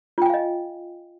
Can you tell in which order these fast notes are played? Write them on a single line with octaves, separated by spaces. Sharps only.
F4 G5 G#5 F5 D#5